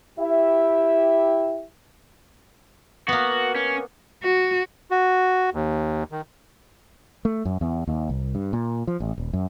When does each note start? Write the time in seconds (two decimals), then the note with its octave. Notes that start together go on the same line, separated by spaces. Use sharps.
0.19 E4 G4 E5
3.08 A#3 B3 F#4
3.56 C#4
4.23 F#4
4.91 F#4
5.53 D#2
6.12 D#3
7.25 A3
7.45 F#2
7.61 E2
7.87 D#2
8.10 C2
8.35 G2
8.53 A#2
8.87 F3
9.00 A1
9.18 D#1
9.33 F#2